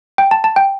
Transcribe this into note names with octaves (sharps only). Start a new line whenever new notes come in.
G5
A5
A5
G5